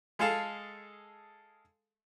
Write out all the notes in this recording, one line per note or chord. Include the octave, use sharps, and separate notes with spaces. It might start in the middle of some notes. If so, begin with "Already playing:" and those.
G#3 G#4 A4 F5 A5